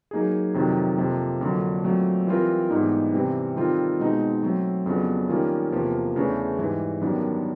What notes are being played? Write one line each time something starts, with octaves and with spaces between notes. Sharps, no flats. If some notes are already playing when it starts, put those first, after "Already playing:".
F#3 A#3 D#4 G#4
F2 C3 D#3 F#3
F2 C3 F3 A#3
F2 D3 F#3 A#3 D4
A#2 F#3 A3 C4
E3 G3 C4 F4 A#4
G#2 E3 G3 B3 D#4
C3 E3 G3 C4
D#3 G3 C4 F4 A4
B2 G#3 C4 D#4
F#3 A3 C4
F2 C#3 F#3 B3 D4
D#3 G3 A#3 C#4 F4
E2 C3 F3 A#3
E2 C#3 E3 A3 D4
G#2 E3 G3
F#2 D#3 G3 B3 D4